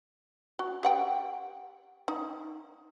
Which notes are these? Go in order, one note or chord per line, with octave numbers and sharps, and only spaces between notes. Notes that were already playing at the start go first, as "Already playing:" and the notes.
F#4
G4 F#5 G5
D#4